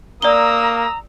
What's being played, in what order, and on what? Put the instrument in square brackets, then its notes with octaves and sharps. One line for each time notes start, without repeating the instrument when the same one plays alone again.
[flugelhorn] A#3 [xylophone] D5 G7 [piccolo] A#5 [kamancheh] D#6 E6